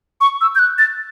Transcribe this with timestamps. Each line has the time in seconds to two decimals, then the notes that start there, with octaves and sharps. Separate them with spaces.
0.21 C#6
0.41 E6
0.55 G6
0.59 F#6
0.78 A6